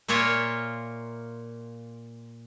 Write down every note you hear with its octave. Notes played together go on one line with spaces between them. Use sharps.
A#2 A#3 F4 C#5 E5